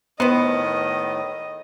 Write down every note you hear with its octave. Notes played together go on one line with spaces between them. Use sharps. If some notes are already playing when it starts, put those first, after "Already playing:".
A2 D#3 B3 B4 C5 D#5